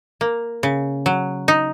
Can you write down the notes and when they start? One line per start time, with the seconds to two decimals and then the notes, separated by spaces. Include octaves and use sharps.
0.21 A#3
0.63 C#3
1.06 F#3
1.48 D#4